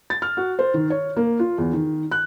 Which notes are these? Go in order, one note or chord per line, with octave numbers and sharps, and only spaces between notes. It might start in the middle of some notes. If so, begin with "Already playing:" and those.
A6
F6
F#4
C5
D#3
C#5
A#3
F4
E2
D#3
F#6